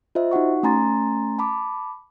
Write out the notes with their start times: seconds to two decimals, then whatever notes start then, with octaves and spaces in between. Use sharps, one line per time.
0.15 F4 C5 D#5 E5
0.31 D#4 F#4 F#5 C#6
0.63 A3 C#4 G#5 A#5 C6 A6
1.39 A5 B5 D6